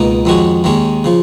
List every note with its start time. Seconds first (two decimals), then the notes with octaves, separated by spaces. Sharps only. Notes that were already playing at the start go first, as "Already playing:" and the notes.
Already playing: C#2 B2 A#3 D#4
0.25 F2 D#3 G#3 C#4 F#4
0.64 D#2 D#3 G#3 C#4
1.04 C#3 F3